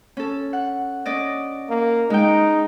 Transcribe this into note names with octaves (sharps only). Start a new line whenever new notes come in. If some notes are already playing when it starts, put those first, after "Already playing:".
C#4 A4
F#5
C#4 D5 D#5
A#3
G#3 D#4 G5